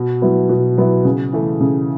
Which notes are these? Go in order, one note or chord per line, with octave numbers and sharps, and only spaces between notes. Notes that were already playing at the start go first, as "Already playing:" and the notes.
Already playing: B2
F#3 B3 E4
B2
F#3 B3 E4
C#3
E3 A3
C#3